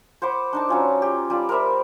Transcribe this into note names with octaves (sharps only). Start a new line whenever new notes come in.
C5 F#5 B5 D6
D4 D#4 A5
F#3 C#4 F4
G4
G3 F4 D5
A#4 C5 E5 B5